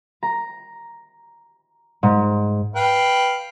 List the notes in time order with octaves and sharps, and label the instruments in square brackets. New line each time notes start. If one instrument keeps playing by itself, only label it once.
[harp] A#5
G#2
[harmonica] B4 F5 G5